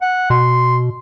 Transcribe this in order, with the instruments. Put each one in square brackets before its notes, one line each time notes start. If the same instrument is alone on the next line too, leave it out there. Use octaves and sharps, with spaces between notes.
[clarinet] F#5
[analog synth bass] B2 [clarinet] C6